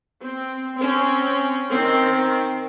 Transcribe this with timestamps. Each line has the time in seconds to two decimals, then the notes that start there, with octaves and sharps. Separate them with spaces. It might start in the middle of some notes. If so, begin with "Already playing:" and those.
0.23 C4
0.77 C4 C#4
1.71 D#3 C4